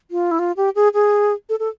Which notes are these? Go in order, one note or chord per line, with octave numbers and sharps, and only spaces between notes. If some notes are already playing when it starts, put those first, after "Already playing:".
F4
E4
F4
G4
G#4
G#4
A4
A4